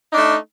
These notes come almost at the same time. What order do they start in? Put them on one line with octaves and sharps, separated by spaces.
D#4 D4 A3